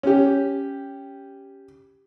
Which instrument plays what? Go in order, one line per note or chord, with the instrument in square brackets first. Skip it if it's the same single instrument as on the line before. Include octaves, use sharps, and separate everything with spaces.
[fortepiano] C#4 G4